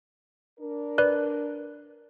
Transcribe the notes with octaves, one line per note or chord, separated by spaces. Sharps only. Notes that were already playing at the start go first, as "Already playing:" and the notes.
D4 A#4
B4 D5 F#6